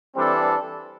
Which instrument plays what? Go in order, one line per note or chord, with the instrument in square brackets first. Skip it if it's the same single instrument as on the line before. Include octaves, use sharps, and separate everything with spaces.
[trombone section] E3 G3 D4 A4 [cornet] C4